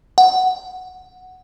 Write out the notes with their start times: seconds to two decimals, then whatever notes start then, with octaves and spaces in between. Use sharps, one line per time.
0.18 F#5